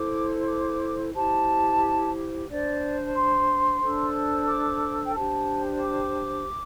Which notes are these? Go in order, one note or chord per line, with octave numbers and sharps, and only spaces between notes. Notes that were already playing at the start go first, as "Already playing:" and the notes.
Already playing: E4 A4 C5 D6
D6
E4 G4 C5 A5
D4 C5 D5
C6
D4 A4 C5
D6
G5
D4 G4 C5 A5
D6